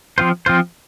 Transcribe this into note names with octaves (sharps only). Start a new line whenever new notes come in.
F3 C4 F4 C5
F3 C4 F4 C5